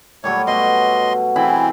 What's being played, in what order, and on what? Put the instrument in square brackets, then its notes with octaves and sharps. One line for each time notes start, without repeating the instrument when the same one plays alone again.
[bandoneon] A#2 C#5 [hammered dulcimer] F#3 G3 A3
[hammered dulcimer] B2 A3 [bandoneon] D#5 C6
[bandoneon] E3 C4 [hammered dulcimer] E4 G#4 B5